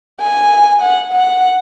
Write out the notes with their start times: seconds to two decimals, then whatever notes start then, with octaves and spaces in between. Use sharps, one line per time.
0.20 G#5
0.82 F#5
1.12 F#5